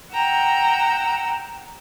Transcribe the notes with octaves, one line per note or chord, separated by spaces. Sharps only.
F#5 G5 A#5 E6